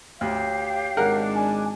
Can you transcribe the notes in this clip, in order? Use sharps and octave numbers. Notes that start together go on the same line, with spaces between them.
D2 G4 C#5 F5
G#1 G#3 D4 A#4 F#5
G#5